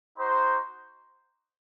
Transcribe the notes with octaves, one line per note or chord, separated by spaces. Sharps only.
D#4 F#4 C5